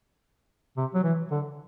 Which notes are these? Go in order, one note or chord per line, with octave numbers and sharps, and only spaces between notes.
C3
F#3
E3
D3